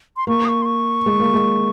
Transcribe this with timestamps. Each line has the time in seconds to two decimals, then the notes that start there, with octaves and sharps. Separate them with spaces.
0.17 C6
0.27 A#3 C#6
0.45 D#6
0.49 C#6
0.62 C6
0.66 C#6
1.06 G#3
1.20 A#3
1.34 G#3